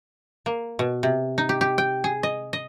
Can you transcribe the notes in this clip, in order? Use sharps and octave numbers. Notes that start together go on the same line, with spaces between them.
A#3
B2
C3
D#4
G4
G4
G5
G#4
D#5
D#5